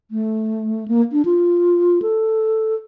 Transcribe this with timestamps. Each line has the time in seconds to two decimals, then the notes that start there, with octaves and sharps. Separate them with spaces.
0.11 A3
0.88 A#3
1.12 D4
1.25 F4
2.02 A4